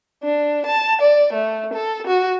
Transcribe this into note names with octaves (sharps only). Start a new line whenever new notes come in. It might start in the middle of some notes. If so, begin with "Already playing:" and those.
D4
A5
D5
A3
A4
F#4